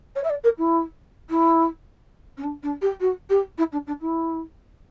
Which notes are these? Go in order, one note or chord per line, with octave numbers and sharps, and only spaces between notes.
C#5
E5
D5
A#4
E4
E4
C#4
D4
D4
G4
F#4
G4
E4
D4
D4
E4